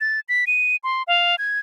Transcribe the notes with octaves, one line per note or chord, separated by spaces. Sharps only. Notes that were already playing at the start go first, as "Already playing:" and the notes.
A6
B6
D#7
C6
F5
G#6